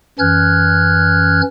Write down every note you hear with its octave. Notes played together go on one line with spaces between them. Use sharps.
F#2 E3 C#4 F6 F#6 G#6